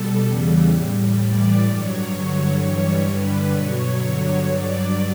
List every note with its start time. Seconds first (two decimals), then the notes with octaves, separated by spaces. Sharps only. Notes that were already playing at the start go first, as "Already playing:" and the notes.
Already playing: B2 G3 A4
0.25 E2 C#3 E3 G3
0.71 A2 G3
1.18 A2 E3 G3 D5
1.65 G2 F#3 C#5
2.11 G2 D3 F#3 C#5
2.58 G2 E3 G3
3.04 G2 D3 G3 B4
3.51 B2 F#3 C#5
3.98 G2 D3 F#3
4.44 G2 F#3 D5